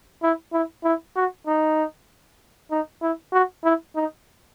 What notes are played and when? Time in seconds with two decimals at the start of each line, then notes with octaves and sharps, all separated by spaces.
0.23 E4
0.53 E4
0.84 E4
1.16 F#4
1.47 D#4
2.71 D#4
3.02 E4
3.33 F#4
3.64 E4
3.96 D#4